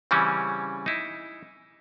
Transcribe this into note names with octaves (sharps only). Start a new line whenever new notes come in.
C#3 E3 G3 C4 C#4
D#4 E4